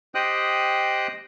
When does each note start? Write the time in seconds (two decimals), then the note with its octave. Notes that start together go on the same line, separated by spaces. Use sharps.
0.15 G4 C5 D#5 G5 D#6 F#6